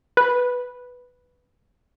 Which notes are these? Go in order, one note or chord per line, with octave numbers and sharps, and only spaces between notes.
B4